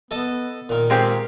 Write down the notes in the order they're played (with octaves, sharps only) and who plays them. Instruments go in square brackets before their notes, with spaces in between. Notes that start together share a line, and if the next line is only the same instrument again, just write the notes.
[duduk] B3 [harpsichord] A4 D#5 A5
[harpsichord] A#2 D#3 [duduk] A#4
[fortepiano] G#3 C4 G4